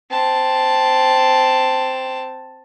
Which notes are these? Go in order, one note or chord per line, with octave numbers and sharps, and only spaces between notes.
C4 A5